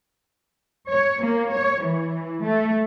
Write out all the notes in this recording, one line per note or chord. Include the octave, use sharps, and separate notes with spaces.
C#5
A#3
C#5
E3
A3